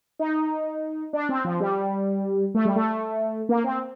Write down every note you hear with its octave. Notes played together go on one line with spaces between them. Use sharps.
D#4
D4
C4
F3
G3
A3
G3
A3
A#3
C4